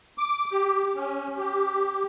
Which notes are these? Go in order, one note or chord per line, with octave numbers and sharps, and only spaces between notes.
D6
G4
C#4
G4